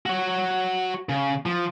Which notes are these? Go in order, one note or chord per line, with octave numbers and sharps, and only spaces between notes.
F#4 C#5
C#3
F3